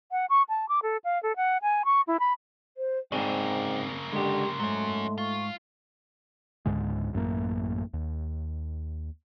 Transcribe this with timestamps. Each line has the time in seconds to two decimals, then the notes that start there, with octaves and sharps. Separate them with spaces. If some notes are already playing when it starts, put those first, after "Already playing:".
0.12 F#5
0.30 C#6
0.49 A5
0.69 D6
0.83 A4
1.04 F5
1.23 A4
1.36 F#5
1.62 G#5
1.85 C#6
2.07 E4
2.20 B5
2.77 C5
3.12 G#2 C#3 A#3 C4 G#4 D5 G5
4.13 D3 G#3 G4 C6
4.60 G#2 F#3 A3 C#4
5.18 F4 C#6
6.66 C#2 G#2 D3 G#3
7.13 A1 F#2 A3 A#3
7.94 D#2